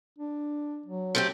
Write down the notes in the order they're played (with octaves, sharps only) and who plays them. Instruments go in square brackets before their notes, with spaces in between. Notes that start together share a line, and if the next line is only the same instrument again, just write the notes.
[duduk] D4
F#3
[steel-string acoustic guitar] A3 C4 G4